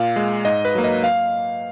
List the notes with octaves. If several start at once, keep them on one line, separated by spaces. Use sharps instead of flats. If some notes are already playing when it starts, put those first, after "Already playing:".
Already playing: A#2 F5
G#3
G#2 D#5
B4
F#3 A#3
D#5
F5